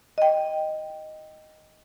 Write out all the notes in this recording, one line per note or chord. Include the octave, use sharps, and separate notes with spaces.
D#5 G5